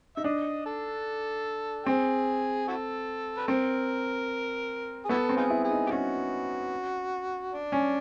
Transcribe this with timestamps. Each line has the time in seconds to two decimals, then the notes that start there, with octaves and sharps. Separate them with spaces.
0.17 D#4 E5
0.24 D4 D#5
0.66 A4
1.86 C4 G#4
2.68 E4 F#4 A4
3.37 B4
3.48 C4 A#4
5.05 G#4
5.09 B3 E4 F#4 A4
5.29 C4
5.37 D#4 F4 G#4
5.50 E4
5.64 G#4
5.71 D#4
5.87 G4
5.90 C#4 F#4
7.53 D4
7.72 C#4